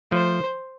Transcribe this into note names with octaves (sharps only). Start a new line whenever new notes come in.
F3 A3 C5